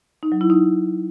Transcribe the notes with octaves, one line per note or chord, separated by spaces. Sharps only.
D#4
F#3
E4
D#4